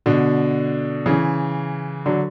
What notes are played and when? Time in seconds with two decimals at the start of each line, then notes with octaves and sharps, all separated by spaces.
0.06 B2 D3
1.06 C#3 E3
2.06 D3 F#3